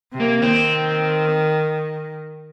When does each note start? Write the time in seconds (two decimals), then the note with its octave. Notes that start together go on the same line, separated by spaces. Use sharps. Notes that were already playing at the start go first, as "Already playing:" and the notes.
0.13 C3
0.20 A#3
0.42 D#3 C4